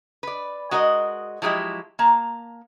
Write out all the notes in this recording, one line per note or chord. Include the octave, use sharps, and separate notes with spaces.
B4 D5
G#3 F#4 A#4 B4 D#5
F3 F#3 G#3 E4 G4
A#3 A5 A#5